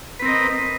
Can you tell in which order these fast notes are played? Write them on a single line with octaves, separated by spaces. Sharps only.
B4 C4 A#4 D#5